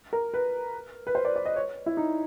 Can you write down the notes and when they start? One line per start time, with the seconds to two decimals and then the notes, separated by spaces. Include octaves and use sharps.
0.13 A#4
0.34 B4
1.07 B4
1.15 C5
1.25 D5
1.36 D5
1.45 D#5
1.56 C#5
1.86 E4
1.97 D#4